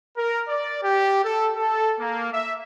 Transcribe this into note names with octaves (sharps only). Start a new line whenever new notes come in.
A#4
D5
G4
A4
A4
A#3
E5